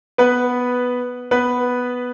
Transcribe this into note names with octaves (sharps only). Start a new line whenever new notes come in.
B3 B4
B3 B4